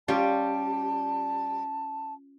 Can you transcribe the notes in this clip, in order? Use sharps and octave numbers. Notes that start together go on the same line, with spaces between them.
G3 C#4 F4 G4 A5